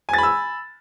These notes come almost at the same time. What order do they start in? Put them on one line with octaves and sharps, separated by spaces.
G#5 A6 B5 E6